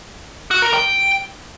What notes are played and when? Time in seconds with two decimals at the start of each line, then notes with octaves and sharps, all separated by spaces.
0.51 F#4
0.62 A#4
0.74 G5